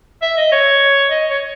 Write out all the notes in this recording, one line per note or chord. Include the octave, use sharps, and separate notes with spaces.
E5
D#5
C#5
D#5
C#5